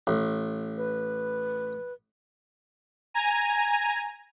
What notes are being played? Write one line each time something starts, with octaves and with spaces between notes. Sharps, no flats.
A1
B4
G#5 A#5